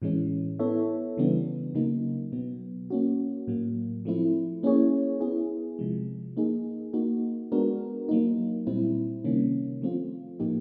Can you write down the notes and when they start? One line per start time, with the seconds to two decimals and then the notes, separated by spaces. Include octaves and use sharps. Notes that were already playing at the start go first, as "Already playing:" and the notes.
0.02 A2 E3 G#3 C#4
0.59 B3 E4 A4 C#5 E5
1.17 C#3 E3 G3 B3 D4
1.75 C#3 F#3 A#3 D#4
2.32 B2 F#3 B3
2.90 A#3 C#4 F#4
3.47 A2 F#3 A#3
4.05 F3 A3 C4 E4
4.63 A#3 C#4 E4 G#4 C#5
5.20 B3 E4 G#4
5.79 C3 F3 G#3
6.37 A#3 D#4 G#4
6.93 A#3 D#4 F#4
7.52 G#3 B3 D4 F#4 A#4
8.09 F#3 A#3 D#4
8.67 A#2 G3 C4 E4
9.24 C3 D#3 G3 A#3 C#4
9.82 F3 A3 C4 F4
10.39 A2 F3 A#3 D#4 G4